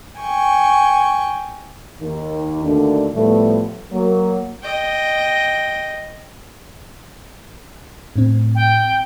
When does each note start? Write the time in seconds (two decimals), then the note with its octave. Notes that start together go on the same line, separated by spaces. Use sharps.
0.19 G5 G#5 C#6
2.00 D#2
2.63 D#2 D3 A3 D4 F#4
3.13 A2 F3 G3 A3 B3
3.90 F#3 A#3
4.63 D#5 G5
8.16 A2 C4
8.55 G5